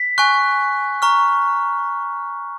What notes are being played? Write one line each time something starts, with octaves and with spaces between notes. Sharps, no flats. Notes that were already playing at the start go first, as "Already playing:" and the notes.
Already playing: B6
G#5 C#6 F#6
A#5 C#6 F6